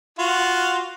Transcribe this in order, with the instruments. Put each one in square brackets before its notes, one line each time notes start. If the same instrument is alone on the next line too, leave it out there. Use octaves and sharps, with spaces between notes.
[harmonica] F4 F#4